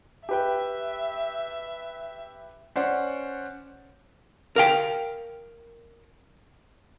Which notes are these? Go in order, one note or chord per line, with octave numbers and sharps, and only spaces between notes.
G4 B4 E5 G5
C#4 C5 D5 F#5
A#4 F5 G5